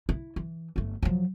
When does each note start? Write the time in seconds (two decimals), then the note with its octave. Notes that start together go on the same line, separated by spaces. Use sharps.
0.09 E4
0.36 E3
0.76 G1 A3
1.03 F3 F#3